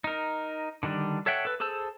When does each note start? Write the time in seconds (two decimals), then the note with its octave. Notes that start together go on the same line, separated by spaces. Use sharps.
0.04 D#4 A#4
0.83 D3 D#3 G3 D4
1.26 A4 C#5 E5 F#5 G5
1.45 A4 B4
1.60 G#4 A4 C5 A5 E6